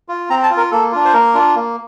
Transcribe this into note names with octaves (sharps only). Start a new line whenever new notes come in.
F4
C4 A#5
A5
F4
A#4
A#3 A4
D4 F4
C5
A#3 A#4
D4 F4
A#3